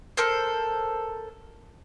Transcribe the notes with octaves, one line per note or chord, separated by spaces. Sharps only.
A4 A#4 C5